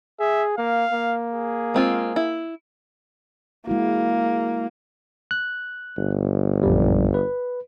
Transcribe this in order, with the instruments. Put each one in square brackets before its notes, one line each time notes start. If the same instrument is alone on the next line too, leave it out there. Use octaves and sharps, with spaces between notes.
[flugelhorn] G#4 [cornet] E5
[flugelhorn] A#3 [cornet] F5
[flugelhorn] A#3
[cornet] G#4
[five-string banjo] G#3 C4 F4
E4
[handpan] G#3 E4 F#4 [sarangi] A#3
[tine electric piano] F#6
[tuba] G1
[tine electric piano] A#1 F#2 G3
B4